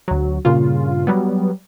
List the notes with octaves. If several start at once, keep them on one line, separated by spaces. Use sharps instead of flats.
D2 F#3
G2 A#2 C#3 F4
F#3 G3 B3